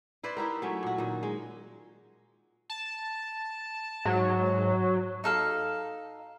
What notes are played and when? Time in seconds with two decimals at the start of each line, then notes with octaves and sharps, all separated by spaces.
0.23 E4 B4 C5 D5
0.37 D#4 E4 G4 A#4
0.62 F#3 A3 C#4
0.83 A#2 F#4
0.98 A#2 D#3
1.23 G#3
2.70 A5
4.05 G#2 F#3
5.24 D#4 A4 F5